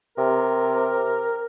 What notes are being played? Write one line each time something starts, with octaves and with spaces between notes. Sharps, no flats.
C3 A#4